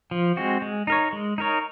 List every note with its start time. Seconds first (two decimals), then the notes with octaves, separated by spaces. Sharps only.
0.11 F3
0.37 G#3 C4 F#4
0.62 G#3
0.87 D#4 A#4 C#5
1.13 G#3
1.38 D#4 A#4 C#5